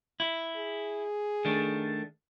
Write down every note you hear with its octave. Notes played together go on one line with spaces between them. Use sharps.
E4
G#4
D#3 A3 D4